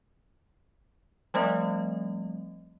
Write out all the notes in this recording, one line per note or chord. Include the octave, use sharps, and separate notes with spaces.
F3 G3 A3 C4 D#5